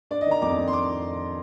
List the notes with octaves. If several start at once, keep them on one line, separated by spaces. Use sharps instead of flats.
D4 D5
D#5
D#3
A#5
F2 D6
F2
C6
D6